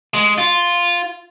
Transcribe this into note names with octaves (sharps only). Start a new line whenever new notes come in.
G#3
F4